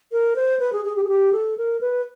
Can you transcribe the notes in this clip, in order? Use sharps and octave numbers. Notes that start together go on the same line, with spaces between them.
A#4
C5
B4
G#4
G#4
G4
G#4
G4
A4
A#4
B4